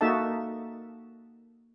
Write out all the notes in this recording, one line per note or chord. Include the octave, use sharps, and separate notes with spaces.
A#3 D#4 F#4 A4 E5 A5